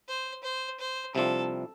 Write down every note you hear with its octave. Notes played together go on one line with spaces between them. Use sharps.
C5
C5
C5
C2 C3 F3 D4 F4 A4